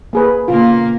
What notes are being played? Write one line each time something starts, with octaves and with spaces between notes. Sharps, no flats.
A#3 G#4 B4
A#2 C#3 A#3 B3 F4